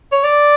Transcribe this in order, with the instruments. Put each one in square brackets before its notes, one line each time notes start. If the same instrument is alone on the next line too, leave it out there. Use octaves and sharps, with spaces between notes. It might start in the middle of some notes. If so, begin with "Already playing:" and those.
[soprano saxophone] C#5
D5